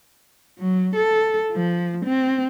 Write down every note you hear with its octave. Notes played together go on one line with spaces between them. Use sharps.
F#3
A4
F3
C4